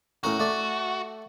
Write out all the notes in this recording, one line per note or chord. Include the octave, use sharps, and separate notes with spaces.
A2 C#4 F#4 A#4
A3 D5